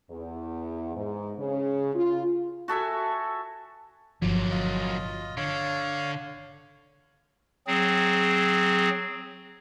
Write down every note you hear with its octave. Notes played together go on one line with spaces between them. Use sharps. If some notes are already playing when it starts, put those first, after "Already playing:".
E2
G#2
C#3
F4
F#4 A4 E5 G#5
G1 A#2 F3 F#3
F4 D#5
D3 C#5 F5
F#3 C4 G#4